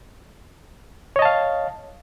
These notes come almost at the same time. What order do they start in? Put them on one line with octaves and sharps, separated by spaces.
C#5 D#5 A5 F5